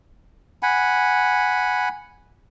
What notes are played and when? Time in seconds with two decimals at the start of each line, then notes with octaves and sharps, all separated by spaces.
0.63 F#5 G#5 B5